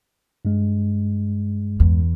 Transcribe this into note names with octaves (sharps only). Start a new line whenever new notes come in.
G2 G#3
E2